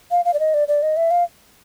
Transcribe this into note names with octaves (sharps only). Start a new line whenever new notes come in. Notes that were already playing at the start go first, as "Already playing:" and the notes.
F5
F5
D5
D#5
D5
D5
D#5
E5
F5